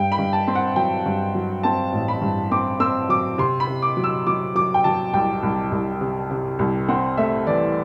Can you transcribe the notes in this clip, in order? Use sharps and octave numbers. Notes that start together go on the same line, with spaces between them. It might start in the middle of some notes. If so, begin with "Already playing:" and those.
Already playing: G2 G5
B5
G2
A5
C4
F#5
F#3 G5
G2
F#3
C4 A5
A1
B5
G2
C4 D6
C4 E6
F#3 D6
C3 C6
B5
C3
D6
F#3
E6
F#3 D6
F#3 D6
G5
F#3 A5
C2 G5
C2
C2
C3
C3
C2
C4 F#5
A3 E5
E3 D5